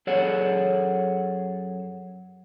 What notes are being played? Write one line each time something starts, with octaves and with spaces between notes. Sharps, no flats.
F#2 G#4 A4 C#5 F#5